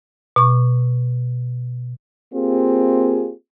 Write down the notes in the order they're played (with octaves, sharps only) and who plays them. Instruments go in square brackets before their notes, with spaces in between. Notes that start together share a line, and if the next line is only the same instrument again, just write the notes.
[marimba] B2 C#6
[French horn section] A#3 C4 F4 G4 G#4